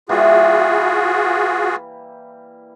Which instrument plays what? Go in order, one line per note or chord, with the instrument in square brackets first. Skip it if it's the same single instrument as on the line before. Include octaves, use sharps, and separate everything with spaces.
[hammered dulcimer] E3 G3 A#3 [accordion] F4 F#4 G#4